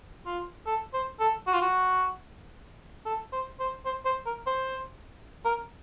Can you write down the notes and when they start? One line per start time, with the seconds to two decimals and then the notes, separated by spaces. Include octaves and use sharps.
0.26 F4
0.67 A4
0.94 C5
1.20 A4
1.47 F#4
1.54 F4
1.62 F#4
3.06 A4
3.33 C5
3.60 C5
3.85 C5
4.05 C5
4.26 A#4
4.46 C5
5.45 A#4